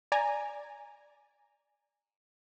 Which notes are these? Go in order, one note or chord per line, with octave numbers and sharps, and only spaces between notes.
D5 G#5 A#5